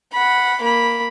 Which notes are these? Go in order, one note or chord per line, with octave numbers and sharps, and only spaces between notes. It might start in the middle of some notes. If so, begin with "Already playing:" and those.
F#5 B5
A#3 B5